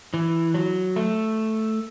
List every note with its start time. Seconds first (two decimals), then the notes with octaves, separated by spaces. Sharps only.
0.14 E3
0.54 F#3
0.96 A3